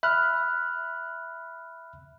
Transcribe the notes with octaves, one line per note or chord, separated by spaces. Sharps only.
E5 B5 F6 F#6